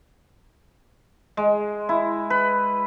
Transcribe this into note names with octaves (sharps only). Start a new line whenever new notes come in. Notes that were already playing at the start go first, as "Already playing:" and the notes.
G#3
E4
B4